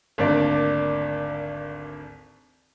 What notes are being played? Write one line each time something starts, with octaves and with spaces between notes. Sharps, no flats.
G#1 D2 A#3 D4 D5